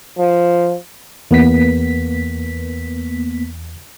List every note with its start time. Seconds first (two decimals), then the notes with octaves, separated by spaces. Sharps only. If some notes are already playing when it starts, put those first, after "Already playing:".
0.18 F3
1.31 E2 A#3 B3 B6